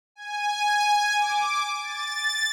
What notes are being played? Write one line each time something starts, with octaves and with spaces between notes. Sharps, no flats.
G#5
D6
A6